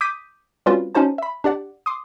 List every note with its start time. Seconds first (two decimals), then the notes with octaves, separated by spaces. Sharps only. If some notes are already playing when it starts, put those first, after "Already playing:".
0.01 D6 D#6 G6 B6 D#7
0.66 G3 C4 C#4 F4 F#4 B4
0.95 C#4 D#4 F#4 C5 A5
1.18 E5 B5
1.44 D4 G4 D5 F#5
1.86 C6 D6 D#6